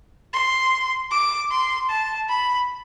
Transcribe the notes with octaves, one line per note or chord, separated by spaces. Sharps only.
C6
D6
C6
A5
B5